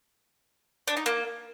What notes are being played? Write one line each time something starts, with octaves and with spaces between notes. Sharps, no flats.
D4
D#4
A#3